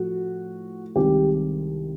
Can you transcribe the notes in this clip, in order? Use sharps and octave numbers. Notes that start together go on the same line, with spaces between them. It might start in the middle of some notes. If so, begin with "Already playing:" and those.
Already playing: A2 F3 A3 F#4
C2 C3 D#3 G#3 G4